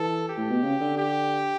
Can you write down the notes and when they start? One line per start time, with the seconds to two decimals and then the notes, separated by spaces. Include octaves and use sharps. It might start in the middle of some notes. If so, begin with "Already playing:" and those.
Already playing: E3 A4
0.29 G4
0.37 A2
0.50 B2
0.63 C#3
0.81 D3
0.98 G4